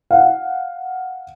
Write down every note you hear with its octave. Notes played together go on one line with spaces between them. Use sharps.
F5 F#5